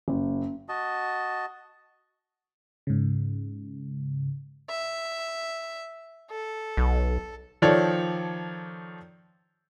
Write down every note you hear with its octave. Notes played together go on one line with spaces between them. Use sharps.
F#1
F#4 D#5 A5
G#2 C#3
E5
A4
B1
D#3 F3 A4 C#5 D5